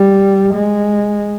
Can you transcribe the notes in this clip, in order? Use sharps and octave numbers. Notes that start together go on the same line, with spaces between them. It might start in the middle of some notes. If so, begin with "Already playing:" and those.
Already playing: G3
G#3